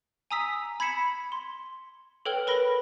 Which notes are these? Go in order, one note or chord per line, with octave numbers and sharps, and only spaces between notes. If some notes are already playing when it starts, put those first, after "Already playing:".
G#5 A#5 D#6 E6 B6
B5 G#6 B6 C#7 E7
C6
A4 B4 C#5 G5 F6 G7
A#4 B4 B5 A#6 D7